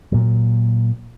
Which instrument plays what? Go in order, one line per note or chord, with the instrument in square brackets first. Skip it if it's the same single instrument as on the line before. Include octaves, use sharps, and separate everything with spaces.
[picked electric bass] A#2 F#3